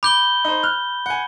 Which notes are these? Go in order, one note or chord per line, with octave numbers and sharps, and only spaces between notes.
B5 D6 G6 G7
D#4 C5
F6 F#6
F#5 G#5